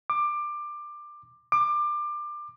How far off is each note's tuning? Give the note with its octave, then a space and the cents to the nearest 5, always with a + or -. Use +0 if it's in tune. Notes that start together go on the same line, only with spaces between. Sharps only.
D6 +20
D6 +25